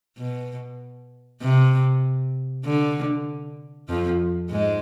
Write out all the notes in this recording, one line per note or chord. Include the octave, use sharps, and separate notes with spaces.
B2
C3
D3
F2 F3
G#2 G#3